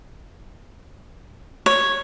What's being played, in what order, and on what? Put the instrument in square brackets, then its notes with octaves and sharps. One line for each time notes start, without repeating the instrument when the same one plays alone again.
[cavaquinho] C#5